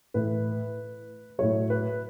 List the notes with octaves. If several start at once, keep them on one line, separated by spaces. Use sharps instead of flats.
A2 E3 B4
A2 F#3 C#5
B4